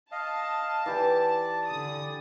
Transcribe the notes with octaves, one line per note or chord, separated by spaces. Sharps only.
D#5 F5 A5
E3 G4 D5 D6
D3 D#6